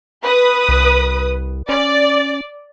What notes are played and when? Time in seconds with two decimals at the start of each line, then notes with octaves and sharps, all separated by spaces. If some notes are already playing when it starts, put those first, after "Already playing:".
0.24 B4 D#6
0.69 C2
1.69 C#4 D5